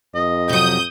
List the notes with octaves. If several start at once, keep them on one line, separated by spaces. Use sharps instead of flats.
F2 D#5
C3 F#3 D#6 G6